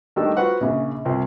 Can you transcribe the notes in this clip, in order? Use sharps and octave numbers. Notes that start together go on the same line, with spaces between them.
D#3 G3 A3 D4 D5 E6
F4 F#4 B4 C5 F#5
A#1 C#3 G#4
C2 F4 G5